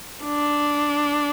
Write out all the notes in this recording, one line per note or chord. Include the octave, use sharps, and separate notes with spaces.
D4